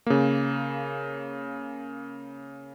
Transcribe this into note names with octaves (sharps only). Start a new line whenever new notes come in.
C#3 A#3